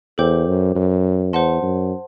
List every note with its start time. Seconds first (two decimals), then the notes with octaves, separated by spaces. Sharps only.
0.18 E2 A4 C5 G5 D6 G6
0.47 F#2
0.76 F#2
1.33 E2 C5 F#5 A5 C6
1.62 F#2